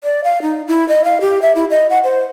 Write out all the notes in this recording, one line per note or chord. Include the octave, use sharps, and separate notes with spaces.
D5
F5
D#4
E4
D#5
F5
G4
E5
E4
D#5
F#5
C5